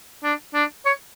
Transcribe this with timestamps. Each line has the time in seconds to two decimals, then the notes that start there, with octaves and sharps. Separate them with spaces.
0.23 D4
0.54 D4
0.86 C#5